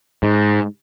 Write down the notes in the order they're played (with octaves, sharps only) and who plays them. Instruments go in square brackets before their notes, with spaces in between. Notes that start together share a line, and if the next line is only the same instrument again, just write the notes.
[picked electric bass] G#2